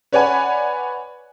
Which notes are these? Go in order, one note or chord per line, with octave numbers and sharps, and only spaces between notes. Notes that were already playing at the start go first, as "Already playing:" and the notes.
B4 C#5 D5 F#5 G#5 B5